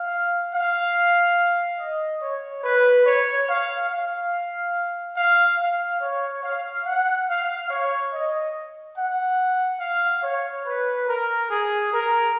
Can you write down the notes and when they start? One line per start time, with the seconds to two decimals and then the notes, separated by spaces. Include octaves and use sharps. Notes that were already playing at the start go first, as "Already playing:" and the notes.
Already playing: F5
0.52 F5
1.78 D#5
2.20 C#5
2.63 B4
3.06 C#5
3.48 F5
3.89 F5
5.15 F5
5.58 F5
6.01 C#5
6.43 F5
6.85 F#5
7.27 F5
7.69 C#5
8.11 D#5
8.96 F#5
9.79 F5
10.23 C#5
10.65 B4
11.07 A#4
11.49 G#4
11.91 A#4